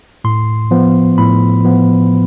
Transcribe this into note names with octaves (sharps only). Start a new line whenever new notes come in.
A2 C6
F3 B3
A2 B5
F3 B3